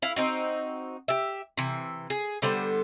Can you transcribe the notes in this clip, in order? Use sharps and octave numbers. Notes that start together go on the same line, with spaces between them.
E4 F5
C4 D#4 F#4
G4 E5
C3 E3
G#4
D3 G3 B3 C5